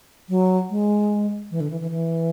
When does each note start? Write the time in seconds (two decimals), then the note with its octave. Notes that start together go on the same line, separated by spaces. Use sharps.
0.29 F#3
0.70 G#3
1.51 E3
1.60 D3
1.71 E3
1.81 E3
1.91 E3